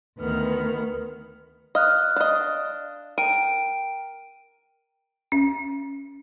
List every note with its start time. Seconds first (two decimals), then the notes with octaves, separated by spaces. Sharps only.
0.18 D2 D#3 B3 F6
1.75 D#5 F5 F6 F#6
2.16 D4 D#5
3.18 A#4 G5 D7 D#7
5.32 C#4